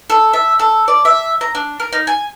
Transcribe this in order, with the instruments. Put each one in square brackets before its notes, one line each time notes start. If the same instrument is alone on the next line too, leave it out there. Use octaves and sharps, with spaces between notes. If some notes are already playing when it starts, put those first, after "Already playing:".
[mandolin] A4
E5
A4
D5
E5
A#5
D4
A#4
D#4
G#5